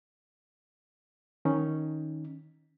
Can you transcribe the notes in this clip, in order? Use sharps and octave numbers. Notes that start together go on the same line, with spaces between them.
D#3 C#4 D#4